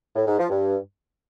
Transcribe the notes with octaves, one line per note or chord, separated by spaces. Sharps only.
A2
G#2
F3
G2